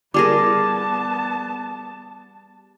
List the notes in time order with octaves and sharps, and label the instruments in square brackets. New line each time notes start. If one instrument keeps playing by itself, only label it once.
[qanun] G3 G#4 A#4 [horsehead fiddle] B3 A5 [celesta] D6